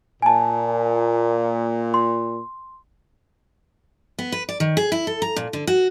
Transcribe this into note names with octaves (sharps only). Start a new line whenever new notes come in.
A#2 G#5 A5
C6
B3
B4
D5
D#3
G#4
E4
A4
A#5
A#2
D3
F#4